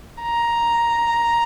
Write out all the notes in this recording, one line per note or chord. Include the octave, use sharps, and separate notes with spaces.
A#5